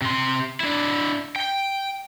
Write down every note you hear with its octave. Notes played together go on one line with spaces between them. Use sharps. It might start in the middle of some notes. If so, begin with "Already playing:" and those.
C3 C6
D4 E4
G5